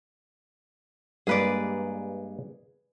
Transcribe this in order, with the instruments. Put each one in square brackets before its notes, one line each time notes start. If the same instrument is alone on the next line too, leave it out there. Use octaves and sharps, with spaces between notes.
[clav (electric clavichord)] G2 G#3 A#3 [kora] G#4 B4 D5